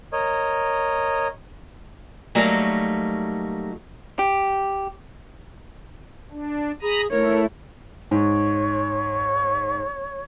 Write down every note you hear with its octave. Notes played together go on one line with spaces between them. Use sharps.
A#4 C#5 D#5
F#3 G3 A3 A#3 D#4 F#4
G4
D4
G#4 A#5 B5 D#6
A3 E4 A#4 C#5
G#2 C#5